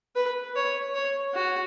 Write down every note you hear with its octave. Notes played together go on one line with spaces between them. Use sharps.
B4
C#5
C#5
F#4